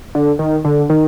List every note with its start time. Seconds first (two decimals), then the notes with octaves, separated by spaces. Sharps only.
0.15 D3
0.39 D#3
0.65 D3
0.90 D#3